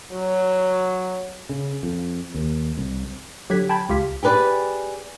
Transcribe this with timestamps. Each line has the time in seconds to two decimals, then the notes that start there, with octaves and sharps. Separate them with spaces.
0.12 F#3
1.49 C#3
1.83 F2
2.34 D#2
2.77 C2
3.50 D3 F#3 G4 F#6 G#6 B6
3.69 G5 A5 B5 G#6
3.89 C#2 F4 G4 F5 B6
4.23 G4 G#4 B4 D5